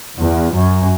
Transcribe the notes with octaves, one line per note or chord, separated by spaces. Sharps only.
E2
F#2